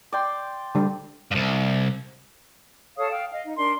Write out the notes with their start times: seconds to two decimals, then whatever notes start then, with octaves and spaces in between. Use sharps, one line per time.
0.12 D5 G5 C6
0.75 D3 G3
1.31 C2 G2
2.97 A4 C#5 F5 D#6
3.10 F5 G5
3.31 D#5 F5
3.44 D#4
3.56 D4 A#4 C6